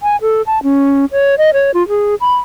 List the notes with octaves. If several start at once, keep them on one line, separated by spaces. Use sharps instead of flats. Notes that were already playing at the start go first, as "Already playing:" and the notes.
G#5
A4
A5
C#4
C#5
D#5
C#5
F4
G#4
B5